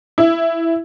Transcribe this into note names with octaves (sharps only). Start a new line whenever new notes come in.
E4